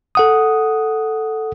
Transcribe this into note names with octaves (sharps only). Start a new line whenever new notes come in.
A4 F#5 D#6